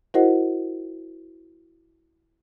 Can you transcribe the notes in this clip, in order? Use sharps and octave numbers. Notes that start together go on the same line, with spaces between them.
E4 F#4 A#4 C5 D#5 F#5